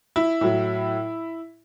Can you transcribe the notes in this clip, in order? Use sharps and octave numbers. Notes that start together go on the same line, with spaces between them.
E4
A2 F#3